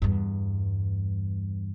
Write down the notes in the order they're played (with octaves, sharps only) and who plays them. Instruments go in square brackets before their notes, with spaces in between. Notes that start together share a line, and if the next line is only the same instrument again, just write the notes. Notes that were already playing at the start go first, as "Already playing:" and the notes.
[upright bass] E2 G2